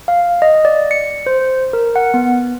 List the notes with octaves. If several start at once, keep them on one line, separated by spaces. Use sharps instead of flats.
F5
D#5
D5
C#7
C5
A#4
F#5
B3